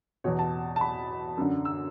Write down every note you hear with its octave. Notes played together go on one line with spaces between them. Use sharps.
E2 B2 C#5
A5
A5
B5
F#2 D3
E6